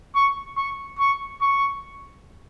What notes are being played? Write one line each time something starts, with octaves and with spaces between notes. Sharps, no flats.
C#6
C#6
C#6
C#6